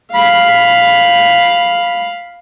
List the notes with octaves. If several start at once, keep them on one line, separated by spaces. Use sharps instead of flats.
F5 B5